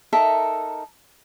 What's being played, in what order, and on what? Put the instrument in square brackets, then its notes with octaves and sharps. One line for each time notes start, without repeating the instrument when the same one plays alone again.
[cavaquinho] D#4 A4 A#4 E5